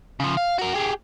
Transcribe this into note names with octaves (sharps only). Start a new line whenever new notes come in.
C#3 F3
F5
F#4 A#4
G4 G#4